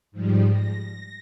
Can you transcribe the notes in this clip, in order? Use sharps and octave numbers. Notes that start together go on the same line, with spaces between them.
G#2 F3 G3
A#6